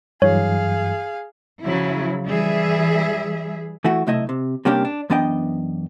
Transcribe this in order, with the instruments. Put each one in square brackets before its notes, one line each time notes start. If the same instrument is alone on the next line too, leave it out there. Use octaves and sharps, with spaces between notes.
[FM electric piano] G2 E3 F#3 [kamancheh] G#4 F5 [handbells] C#5
[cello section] C#3 F3 F#3 E4
E3 G3 G#4 E5
[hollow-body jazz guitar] E3 A3 E4 F#4
B1 C3 A3 E4 D#5 E5
C3
C3 G3 A#3 C#4 D4 G4
D4
F#2 E3 B3 D4 D#5 G5